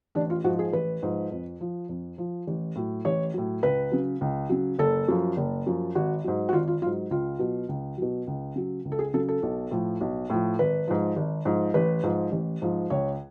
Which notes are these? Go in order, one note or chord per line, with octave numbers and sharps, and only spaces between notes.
A1 D4
F4
G#2 F3 F#4
G#4
A1 B4
G#2 F3
F2
F3
F2
F3
A1
A2 F#3
A1 C#5
A2 F#3
C#2 B4
C#3 F#3
C#2
C#3 F#3
F#1 A4
F#2 F3
F#1
F#2 F3
G#1 F#4
G#2 F#3
F#4
G#1 F4
F4
G#2 F#3 F4
C#2 F4
B2 F#3
C#2
B2 F#3
C#2
C#3 F#3
C#2
A4
G#4
C#3 F#3 A4
A4
B1
A2 F3
B1
A2 F3
G#1 B4
G#2 F3
G#1
G#2 F3
A1 B4
G#2 F3
A1
G#2 F3
C#2 C#5